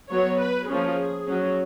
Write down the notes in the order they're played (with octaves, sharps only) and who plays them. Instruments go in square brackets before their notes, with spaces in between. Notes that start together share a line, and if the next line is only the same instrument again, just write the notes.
[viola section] F#3 B3 C#5
B4
F3 A#3 C#4 G#4
F#3 C#4